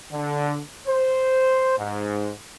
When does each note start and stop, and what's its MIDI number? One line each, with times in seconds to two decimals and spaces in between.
0.12 0.61 50
0.88 1.73 72
1.78 2.32 44